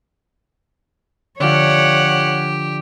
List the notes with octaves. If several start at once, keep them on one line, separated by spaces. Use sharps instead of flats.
D3 F3 G4 C#5 F#5